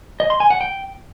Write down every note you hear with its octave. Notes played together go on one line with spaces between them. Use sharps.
D#5
C6
G#5
F#5
G5